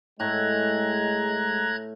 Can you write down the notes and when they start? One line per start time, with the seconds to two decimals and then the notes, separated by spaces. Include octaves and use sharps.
0.20 A2 G#3 A#5 F#6 G#6